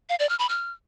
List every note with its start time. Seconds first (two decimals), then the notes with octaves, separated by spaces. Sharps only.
0.09 F5
0.19 D5
0.29 F6
0.39 B5
0.49 F6